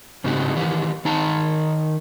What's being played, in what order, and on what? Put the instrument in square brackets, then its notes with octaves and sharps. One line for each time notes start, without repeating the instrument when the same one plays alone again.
[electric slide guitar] G#2 C#3 C4 D#4 F#4 G4
D#3 E3 G4
D#3 D#4 A5 A#5